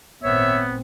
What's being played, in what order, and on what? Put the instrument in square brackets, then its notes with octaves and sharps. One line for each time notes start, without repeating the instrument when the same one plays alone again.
[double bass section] G#1 A#2 C4 [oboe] B3 [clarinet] C#5 [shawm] E5